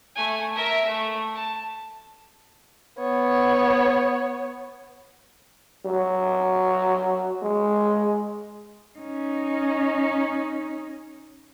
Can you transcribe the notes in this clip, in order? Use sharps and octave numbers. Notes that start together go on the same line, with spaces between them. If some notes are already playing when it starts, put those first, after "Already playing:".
A3 G#5
A#4 E5
A3
A5
B3 C#5
F#3
G#3
C#4 D#4